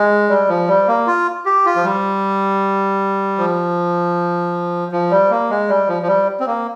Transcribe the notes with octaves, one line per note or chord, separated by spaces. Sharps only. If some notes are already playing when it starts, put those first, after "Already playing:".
Already playing: G#3
G3
F3
G3
A#3
F4
G4
F4
F3
G3
F3
F3
G3
A#3
G#3
G3
F3
F3
G3
C4
A#3